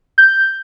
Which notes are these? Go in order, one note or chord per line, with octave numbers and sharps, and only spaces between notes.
G6